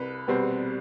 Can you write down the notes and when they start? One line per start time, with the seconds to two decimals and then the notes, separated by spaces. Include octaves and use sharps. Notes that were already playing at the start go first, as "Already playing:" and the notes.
Already playing: C2 B4
0.28 B2 G3 C4